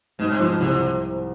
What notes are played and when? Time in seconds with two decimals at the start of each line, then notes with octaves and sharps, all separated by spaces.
0.19 G#2 B2
0.31 C3
0.40 B2 F3
0.60 C2 C3